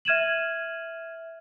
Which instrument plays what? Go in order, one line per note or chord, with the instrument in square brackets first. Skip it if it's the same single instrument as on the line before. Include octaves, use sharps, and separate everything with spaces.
[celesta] E5 F6 G#6 D#7 E7 F#7